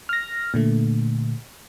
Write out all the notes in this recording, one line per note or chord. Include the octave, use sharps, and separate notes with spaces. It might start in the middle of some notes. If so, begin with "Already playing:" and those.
F6 A#6
A#2 D3 A3